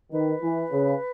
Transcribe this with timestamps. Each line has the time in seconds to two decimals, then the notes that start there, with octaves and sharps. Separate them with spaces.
0.11 D#3 B4
0.42 E3
0.72 C#3